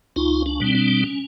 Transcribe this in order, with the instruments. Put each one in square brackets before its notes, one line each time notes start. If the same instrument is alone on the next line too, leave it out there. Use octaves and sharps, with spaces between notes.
[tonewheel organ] C#2 D#4 F4
D4
B2 G3 C4
D4
C#4